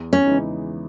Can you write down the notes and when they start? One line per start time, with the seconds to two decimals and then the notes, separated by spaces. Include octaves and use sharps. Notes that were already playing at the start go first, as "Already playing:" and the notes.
Already playing: E2
0.13 C#4
0.26 C#3 E3 G#3 D#4